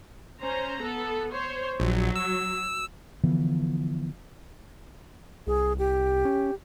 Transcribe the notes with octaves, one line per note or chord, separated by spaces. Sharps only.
C#4 C5 A#5
B3 A4
C5 C#5
A#1 F#3
E6
D3 E3 F3 B3
C2 G#4
G4
C#4